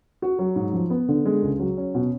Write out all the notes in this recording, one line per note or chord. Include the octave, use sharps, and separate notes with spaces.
F#4
F#3
G#2
F3
B3
D3
G#3
C#2
F#3
C#4
B2